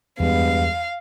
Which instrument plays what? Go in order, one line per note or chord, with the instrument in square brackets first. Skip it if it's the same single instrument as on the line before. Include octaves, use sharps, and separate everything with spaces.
[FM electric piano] E2 [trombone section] G2 G#3 B3 [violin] F5